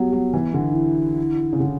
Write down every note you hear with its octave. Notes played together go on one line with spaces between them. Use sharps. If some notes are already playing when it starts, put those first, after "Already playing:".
Already playing: F#3 G3 B3
F#3
E3
D3
D#4
E4
C#3
D3